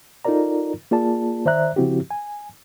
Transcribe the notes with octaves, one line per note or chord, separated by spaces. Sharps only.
D#4 F4 A4 A#4 D5 A#5
A#3 F4 G#4 D5 A5
D#3 C5 D5 E5 A#5 F#6
C#3 F3 C4 E4 F#4 G4
G#5